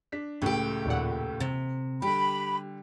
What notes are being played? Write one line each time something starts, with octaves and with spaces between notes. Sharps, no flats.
D4 B6
C#2 A2 C#3 A3 G4
D#2 A#2 F#5
C3
D3 G3 G4 B5